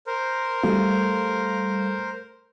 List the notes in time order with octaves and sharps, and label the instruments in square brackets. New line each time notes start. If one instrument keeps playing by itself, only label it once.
[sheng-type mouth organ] A#4 C5
[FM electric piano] G3 F5 [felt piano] A3